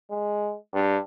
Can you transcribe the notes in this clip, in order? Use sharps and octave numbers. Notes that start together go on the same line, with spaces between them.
G#3
G2